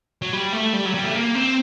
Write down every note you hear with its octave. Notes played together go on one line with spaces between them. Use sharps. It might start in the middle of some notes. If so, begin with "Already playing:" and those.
F#3
G3
A3
G3
F#3
G3
A3
A#3
C4